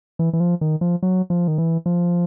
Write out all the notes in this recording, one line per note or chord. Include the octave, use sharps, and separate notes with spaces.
E3
E3
F3
D#3
F3
F#3
F3
D#3
E3
F3